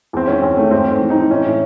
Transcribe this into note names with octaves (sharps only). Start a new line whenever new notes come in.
E2 C4
D#3 C#4
E2 C4
D#3 A3
G#2 C4
G#2
C4
E3
D#4
E3
A2 C#4
A2